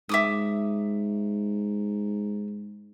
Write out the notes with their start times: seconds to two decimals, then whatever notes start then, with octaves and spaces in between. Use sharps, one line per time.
0.09 G#2 E5 D6 D#6